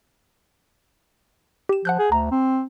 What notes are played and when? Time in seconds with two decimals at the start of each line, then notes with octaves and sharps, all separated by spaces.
1.69 G4 E7
1.85 F3 F#5 F#6 G6
1.99 G#4
2.12 D2 A#5
2.31 C4